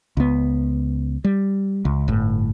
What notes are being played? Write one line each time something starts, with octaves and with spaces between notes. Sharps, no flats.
C#2 B3
G3
C#2
G1 A2